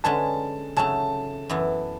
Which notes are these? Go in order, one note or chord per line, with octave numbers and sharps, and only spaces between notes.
D3 G#3 C#4 G#4 B4 A5
C#3 F#3 A3 A5
F#2 E3 B3 E4